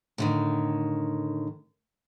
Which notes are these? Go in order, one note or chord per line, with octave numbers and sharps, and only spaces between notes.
A2 D3 D#3